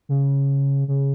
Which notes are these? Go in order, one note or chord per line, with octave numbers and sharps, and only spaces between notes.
C#3
C#3